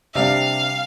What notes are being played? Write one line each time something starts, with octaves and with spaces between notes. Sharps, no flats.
C3 G3 D4 F5